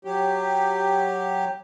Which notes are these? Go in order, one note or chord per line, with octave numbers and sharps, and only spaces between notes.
F#3 G4